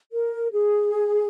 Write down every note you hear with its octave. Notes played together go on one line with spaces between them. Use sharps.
A#4
G#4